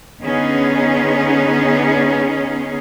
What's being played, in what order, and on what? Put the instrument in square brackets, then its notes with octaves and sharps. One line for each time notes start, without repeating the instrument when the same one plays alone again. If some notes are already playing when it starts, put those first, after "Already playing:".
[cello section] D3 B3 C#4 D#4 G#4